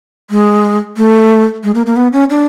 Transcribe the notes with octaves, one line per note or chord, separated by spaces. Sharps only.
G#3
A3
G#3
A#3
A#3
B3
C#4
D4